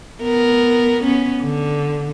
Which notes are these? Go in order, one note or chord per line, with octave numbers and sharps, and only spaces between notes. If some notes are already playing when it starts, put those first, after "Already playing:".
B3 A#4
B3 C#4
D3